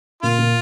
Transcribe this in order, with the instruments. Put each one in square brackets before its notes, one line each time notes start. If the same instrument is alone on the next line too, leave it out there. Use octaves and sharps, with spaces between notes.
[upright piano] A#2 [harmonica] F4
[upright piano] A#2